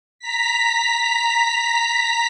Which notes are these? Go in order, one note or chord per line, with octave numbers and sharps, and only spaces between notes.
A#5 B6